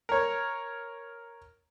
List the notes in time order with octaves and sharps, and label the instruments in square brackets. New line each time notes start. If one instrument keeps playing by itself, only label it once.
[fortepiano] A#4 C#5